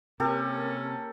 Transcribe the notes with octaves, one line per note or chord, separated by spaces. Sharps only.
C3 A#3 C#4 G4 A4 A#4